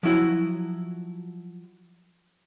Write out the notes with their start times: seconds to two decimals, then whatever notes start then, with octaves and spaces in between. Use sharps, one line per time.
0.03 F3 F#3 E4 F#4